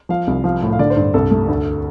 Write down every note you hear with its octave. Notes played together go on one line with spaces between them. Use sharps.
F3 F5
C2
F3 F5
A2
F5
D3 D5
C5
G2
C2 A4
A3
D2